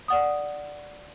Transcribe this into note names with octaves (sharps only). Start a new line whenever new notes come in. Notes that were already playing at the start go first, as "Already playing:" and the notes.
D5 F#5 D#6